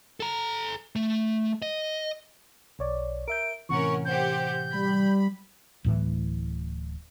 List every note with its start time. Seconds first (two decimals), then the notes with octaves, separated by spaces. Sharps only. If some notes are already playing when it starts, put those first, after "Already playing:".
0.20 A4 A#5
0.96 A3
1.62 D#5
2.79 B1 C#5 D5
3.28 A#4 E5 G6 D7
3.69 A2 C3 E3 C#4 A#4 F#5 C#6
4.05 G4 C5 F#5 G6
4.74 G3 B5
5.84 D1 A2 E3